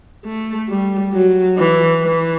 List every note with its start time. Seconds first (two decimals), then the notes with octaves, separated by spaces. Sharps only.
0.25 A3
0.69 G3
1.14 F#3
1.58 E3
2.02 E3